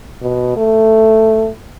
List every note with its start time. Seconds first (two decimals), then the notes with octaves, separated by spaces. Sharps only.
0.22 B2
0.57 A3